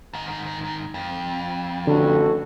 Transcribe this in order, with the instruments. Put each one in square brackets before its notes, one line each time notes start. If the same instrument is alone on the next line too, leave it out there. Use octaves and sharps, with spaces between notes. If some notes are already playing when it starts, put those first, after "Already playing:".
[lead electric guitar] G#2 D#3
F2
[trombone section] A1 F#4 A4 [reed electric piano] D3